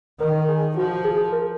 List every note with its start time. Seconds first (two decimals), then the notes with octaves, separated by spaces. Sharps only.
0.20 D#3 A#4
0.48 G#4
0.76 F3 F#4
1.04 G#4
1.32 A#4